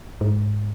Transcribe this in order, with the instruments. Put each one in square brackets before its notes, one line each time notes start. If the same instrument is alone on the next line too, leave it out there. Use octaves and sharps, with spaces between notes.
[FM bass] G#2